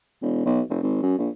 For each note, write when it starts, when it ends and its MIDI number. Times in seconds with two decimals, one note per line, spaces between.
0.22 0.41 28
0.46 0.61 35
0.70 0.82 29
0.83 0.98 32
1.03 1.18 42
1.18 1.29 34